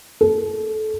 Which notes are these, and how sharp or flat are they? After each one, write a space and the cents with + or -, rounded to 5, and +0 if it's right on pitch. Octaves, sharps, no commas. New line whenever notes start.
A4 -25